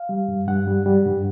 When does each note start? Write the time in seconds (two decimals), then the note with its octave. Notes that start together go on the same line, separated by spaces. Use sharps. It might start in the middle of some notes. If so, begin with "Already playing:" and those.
Already playing: F5
0.09 G3
0.28 G2
0.48 G2 F#5
0.67 G3
0.86 G3
1.06 G2